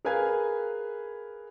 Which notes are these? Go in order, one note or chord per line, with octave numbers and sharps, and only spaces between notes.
G#4 A#4 B4 F5 G#5 G#6